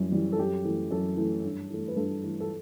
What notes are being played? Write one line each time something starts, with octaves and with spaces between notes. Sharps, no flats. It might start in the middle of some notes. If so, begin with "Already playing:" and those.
Already playing: F#2 E3 G3
E3 G3
A4
F#2 G4
E3 A3
F#2 A4
E3 A3
G2
E3 A3
B4
G2 A4
E3 A3
A4